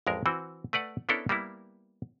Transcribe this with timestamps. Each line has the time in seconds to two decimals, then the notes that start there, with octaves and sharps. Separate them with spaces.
0.07 A1 F2 G#3 A#4
0.26 E3 C4 F#4
0.73 A3 B4 D5 F#5
1.09 B3 C#4 D4 E4 A4 A#4
1.29 G3 A#3 B3 E4